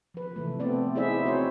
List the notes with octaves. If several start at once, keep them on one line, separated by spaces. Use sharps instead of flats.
F3 B4
C3 E3 A3
A3 B3 C4 D5
D#4 E4 G#4 C5 D5 E5
C4 F#4 C5 C#5